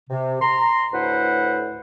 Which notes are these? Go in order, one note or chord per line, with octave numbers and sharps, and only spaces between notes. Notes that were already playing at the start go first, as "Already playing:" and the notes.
C3
A#5 C6
D2 A2 E4 B4 C5 F#5